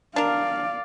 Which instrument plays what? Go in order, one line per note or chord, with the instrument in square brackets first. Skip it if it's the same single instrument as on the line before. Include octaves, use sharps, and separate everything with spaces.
[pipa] D4 A#4 [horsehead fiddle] D5 F5